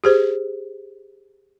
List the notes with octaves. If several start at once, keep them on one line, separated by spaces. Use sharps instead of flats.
G4 G#4 C5